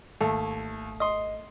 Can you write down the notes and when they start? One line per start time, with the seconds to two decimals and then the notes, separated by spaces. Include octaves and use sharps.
0.21 G#1 D#2 A3
1.00 D#5 C6 D#6